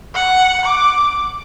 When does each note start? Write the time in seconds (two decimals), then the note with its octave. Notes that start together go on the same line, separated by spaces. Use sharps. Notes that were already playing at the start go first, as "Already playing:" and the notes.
0.14 F#5
0.65 D6